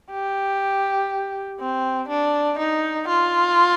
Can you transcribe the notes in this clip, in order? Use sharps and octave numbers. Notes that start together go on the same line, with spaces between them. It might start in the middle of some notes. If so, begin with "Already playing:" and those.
G4
C4
D4
D#4
F4